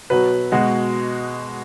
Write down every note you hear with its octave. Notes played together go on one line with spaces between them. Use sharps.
B2 F#3 B4
B2 G#3 F#4